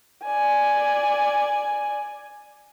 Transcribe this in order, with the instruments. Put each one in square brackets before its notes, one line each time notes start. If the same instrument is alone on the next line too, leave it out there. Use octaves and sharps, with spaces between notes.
[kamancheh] D5 G#5